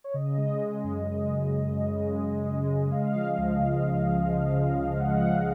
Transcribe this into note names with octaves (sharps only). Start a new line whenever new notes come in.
C#5
C#3 D#5
G#3
G#3
F#2
G#3
F#2
F#2
C#3
G#3
G#3
G#3
G#3
C#3 F5
F3
C#2
C#2
F3
F3
F3
C#3
F3
C#3 F#5
C#3